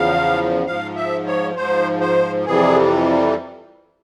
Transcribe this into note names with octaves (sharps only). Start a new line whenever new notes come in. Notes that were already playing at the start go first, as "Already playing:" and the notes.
Already playing: E2 C#3 F3 F5
G#2 F3 F5
E5
C#5
G#2 F3 C5
C5
F2 C3 E3 G3 G#4